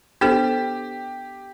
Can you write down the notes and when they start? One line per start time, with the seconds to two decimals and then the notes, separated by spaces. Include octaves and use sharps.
0.21 B3 D4 G4 A4 C5